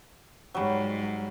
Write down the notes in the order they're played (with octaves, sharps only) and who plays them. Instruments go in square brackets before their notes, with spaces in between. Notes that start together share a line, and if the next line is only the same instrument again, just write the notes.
[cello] G#2 [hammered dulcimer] F#3 G3